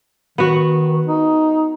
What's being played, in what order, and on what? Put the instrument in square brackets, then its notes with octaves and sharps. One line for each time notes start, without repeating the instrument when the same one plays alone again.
[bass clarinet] D#3 [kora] B3 F#4
[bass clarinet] D#4